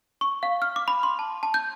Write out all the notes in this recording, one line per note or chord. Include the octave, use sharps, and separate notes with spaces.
C#6
F5
F6
D6
B5
C6
A5
A5
G6